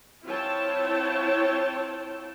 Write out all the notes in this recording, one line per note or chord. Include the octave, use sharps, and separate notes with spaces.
C4 E4 F4 C#5 G5 A5